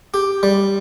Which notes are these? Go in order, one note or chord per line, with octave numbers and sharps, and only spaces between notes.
G4
G3